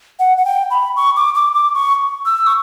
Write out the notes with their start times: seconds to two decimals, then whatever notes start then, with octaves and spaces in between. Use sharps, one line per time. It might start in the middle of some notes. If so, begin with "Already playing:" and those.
0.19 F#5
0.37 F#5
0.45 G5
0.71 B5
0.97 C#6
1.16 D6
1.35 D6
1.54 D6
1.75 C#6
2.26 E6
2.47 C#6